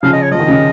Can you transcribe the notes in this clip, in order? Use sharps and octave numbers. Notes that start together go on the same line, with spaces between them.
C#3 F3 F5
D#5
C#5
F3 D#5
D#3
C#3